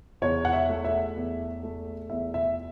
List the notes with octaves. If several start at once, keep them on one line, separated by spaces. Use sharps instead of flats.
E2 C#5
F#5
E5
A3
E5
E2
A3
E2 E5
E5